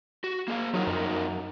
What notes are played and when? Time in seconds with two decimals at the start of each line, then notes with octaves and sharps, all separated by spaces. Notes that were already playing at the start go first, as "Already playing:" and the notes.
0.24 F#4
0.48 A#3 G#4 F5
0.74 F2 F#3 D#4 A#4
0.87 F#2